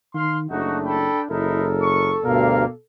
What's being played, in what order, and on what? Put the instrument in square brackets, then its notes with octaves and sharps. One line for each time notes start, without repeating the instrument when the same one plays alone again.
[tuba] D#3 [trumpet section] F5 C6
[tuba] F#1 [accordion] A3 [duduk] D4 [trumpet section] D#4 F#4
[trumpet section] A4 G5 B5
[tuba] F#1 [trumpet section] D#4 E4 [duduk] A4 [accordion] A#4
[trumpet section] C#6
[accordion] D2 G2 A#4 [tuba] B2 [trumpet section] A#3 D5 F5